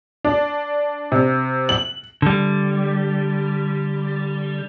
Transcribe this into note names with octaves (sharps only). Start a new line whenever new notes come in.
D4
C3
F#7
D3 G3